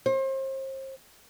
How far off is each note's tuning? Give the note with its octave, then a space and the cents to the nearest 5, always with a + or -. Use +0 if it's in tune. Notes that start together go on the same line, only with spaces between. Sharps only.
C5 +35